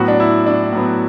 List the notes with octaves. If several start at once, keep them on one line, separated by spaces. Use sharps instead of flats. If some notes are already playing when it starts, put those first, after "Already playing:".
Already playing: A2 F#3 B3 F#4
D4
E4
D4
A2 F#3 B3